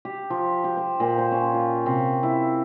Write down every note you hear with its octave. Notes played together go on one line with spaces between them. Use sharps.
G4
F3
G4
C5
A#2
C5
C#4
F4
C3
E4